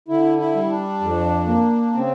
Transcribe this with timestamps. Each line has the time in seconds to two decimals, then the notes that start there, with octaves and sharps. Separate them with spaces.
0.08 D3 E4
0.38 E4
0.55 G3
0.70 D4
1.01 F2
1.46 A#3
1.93 C#3 C4